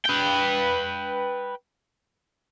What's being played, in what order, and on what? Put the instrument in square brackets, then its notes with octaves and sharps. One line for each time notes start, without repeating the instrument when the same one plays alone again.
[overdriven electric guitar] B4 G5